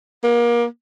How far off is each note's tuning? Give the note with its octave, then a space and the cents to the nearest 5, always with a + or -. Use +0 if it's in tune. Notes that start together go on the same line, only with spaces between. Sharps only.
A#3 +30